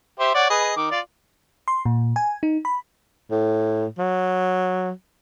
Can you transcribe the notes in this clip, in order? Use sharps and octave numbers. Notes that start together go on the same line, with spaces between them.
G4 C5 E5
C#5 D5 F#5
G#4 B4 D#5
D#3 D6
F4 D5
C6
A#2
G#5
D#4
B5
A2
F#3